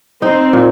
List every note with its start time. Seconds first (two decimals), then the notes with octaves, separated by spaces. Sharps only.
0.22 C4 D#4
0.53 A#2